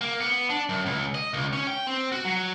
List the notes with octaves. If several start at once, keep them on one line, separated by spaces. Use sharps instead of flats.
A#3
B3
D4
F#2
C#2
D#5
C#2
C#4
G5
C4
F#4
F#3